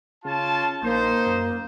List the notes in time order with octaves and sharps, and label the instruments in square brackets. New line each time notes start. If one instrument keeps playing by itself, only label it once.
[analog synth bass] C#3 [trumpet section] F4 C#5 A5
[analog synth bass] A#1 [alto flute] A#3 [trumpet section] D#4 C5
[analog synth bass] F#2